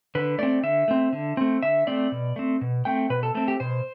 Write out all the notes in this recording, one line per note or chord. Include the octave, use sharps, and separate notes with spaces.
D3 B4
A3 C4 D5
D3 E5
A3 C4
D3
A3 C4
D3 E5
A3 C4 D5
B2
A3 C4
B2
A3 C4 G5
B2 B4
A4
A3 C4 A4
G4
B2 C5